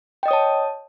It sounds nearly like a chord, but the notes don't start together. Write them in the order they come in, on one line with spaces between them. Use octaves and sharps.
G5 D#5 D#6 C#5 A5